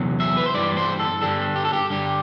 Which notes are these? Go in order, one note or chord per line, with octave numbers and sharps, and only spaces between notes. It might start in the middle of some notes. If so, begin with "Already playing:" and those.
Already playing: E2 C3 F#3
E5
B4
C5
G2 E3 G3 D5
C5
A4
G2 D3 G3 A4
G4
A4
G4
G2 D3 G3 G4